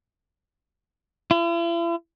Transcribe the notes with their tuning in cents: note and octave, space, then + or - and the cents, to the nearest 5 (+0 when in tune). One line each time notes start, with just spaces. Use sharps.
E4 +45